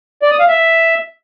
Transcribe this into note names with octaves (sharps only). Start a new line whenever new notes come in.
D5
D#6
F5
E5